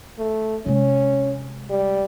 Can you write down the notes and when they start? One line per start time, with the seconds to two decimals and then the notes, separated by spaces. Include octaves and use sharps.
0.18 A3
0.66 C3 G#3 C#4
1.70 G3